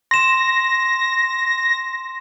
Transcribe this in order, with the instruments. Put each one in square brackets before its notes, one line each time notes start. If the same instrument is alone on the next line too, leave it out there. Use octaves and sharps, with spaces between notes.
[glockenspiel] C6 E7 [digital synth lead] A#6